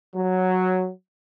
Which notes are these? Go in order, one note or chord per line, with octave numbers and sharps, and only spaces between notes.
F#3